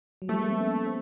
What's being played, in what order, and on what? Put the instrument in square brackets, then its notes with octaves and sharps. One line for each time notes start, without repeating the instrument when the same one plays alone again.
[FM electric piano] F#3
[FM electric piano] F3 G3 [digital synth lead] A3
[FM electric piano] G#3 A#3
A#3 C4
B3 C#4
C4